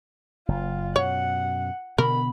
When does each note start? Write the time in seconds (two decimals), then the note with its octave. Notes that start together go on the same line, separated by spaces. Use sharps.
0.48 F#1 F4
0.96 F#2 B2 C#5 F#5
1.98 B2 D3 B3 A#4 B5